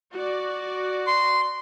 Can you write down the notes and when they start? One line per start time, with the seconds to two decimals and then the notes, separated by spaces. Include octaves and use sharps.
0.13 F#4 D5
1.07 C6